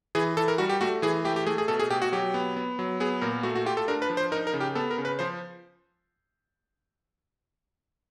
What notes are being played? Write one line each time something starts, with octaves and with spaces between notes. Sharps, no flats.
E3 G#4
E3 A4
A#4
G3 F#4
G4
A3 F#4
E3 G#4
A3 G4
G4
A3 G#4
G#4
B2 A4
G#4
B2 G4
F#4
F#3 G4
B3
B3
F#3
B3 G#4
A#2 A#4
A3 F#4
F#4
F4 G4
A4
D4 A#4
B4
F3
C5
D#4 A#4
A#4
C#3
G4
B3 A4
A#4
C#3
B4
F3 C5